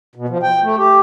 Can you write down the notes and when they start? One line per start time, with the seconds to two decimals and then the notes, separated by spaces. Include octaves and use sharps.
0.15 B2
0.29 F3
0.43 G5
0.63 A3
0.78 G4